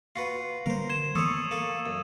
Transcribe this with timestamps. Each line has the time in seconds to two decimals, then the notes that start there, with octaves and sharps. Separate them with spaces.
0.16 F4 F#4 B4 C7
0.66 D3 G3 A#3 A#4 C5
0.90 C6 G#6 E7
1.15 E3 A3 B3 A4 C#5 C#6 D#6 E6
1.51 A#3 A4
1.86 F#2